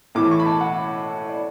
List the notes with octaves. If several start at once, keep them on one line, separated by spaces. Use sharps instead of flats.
A2 E3 D6
C#6
B5
A5
F#5
D5